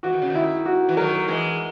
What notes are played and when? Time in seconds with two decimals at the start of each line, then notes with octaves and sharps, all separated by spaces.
0.03 E3 F#4
0.13 D#3
0.22 C#3
0.30 D#3 E4
0.65 F#4
0.89 E3
0.97 D#3 F#3 A#4
1.28 E3 G#3